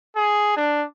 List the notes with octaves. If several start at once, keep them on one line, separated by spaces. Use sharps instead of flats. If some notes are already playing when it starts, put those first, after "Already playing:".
G#4
D4